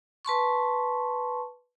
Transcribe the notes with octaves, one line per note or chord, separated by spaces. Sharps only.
B4 A5 C6 C#6